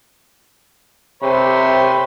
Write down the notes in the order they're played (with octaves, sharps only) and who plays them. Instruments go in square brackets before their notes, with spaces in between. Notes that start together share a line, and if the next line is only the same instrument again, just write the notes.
[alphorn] C3 [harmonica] C5 C#5 B5